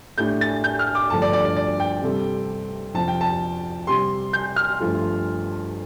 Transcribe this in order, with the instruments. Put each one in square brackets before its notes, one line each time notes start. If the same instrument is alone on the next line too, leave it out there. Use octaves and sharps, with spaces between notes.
[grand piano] A2 A3 D4 G4 [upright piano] G6
[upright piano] A6
G6
F6
D6
[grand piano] G2 D3 F3 A3 D4 [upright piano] A5
[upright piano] D5
D5
D5
D5
G5
[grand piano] C3 G3 C4 A4
[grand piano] F2 C3 F3 [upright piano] A5
[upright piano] G5
A5
[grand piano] C3 G3 C4 G4 [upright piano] C6
[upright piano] G6
F6
[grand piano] G2 F3 A3 F4 A4